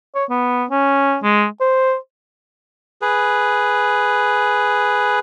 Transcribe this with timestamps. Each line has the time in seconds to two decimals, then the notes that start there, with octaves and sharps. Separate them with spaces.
0.15 C#5
0.29 B3
0.70 C#4
1.23 G#3
1.61 C5
3.02 G#4 B4